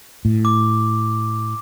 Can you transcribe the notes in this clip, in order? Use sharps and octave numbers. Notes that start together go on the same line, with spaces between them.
A2
D6